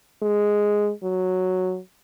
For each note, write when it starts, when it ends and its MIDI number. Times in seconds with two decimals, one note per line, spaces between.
0.22 0.92 56
1.03 1.79 54